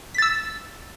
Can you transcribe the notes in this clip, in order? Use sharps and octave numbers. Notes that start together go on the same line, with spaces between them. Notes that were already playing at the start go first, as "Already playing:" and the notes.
E6 A6 B6